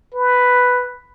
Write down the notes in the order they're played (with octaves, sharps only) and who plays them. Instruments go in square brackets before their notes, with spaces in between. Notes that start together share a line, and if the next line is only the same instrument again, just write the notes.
[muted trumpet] B4